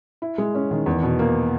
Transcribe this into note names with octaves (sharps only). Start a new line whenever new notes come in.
E4
G#3
C#4
D#3
E2
B2
A#3